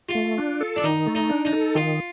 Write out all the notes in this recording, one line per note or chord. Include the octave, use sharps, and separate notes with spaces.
F4
A3
D4
A4
D4
D#3 D#4
A3
D#4
D4
D#4
A4
D#3 F4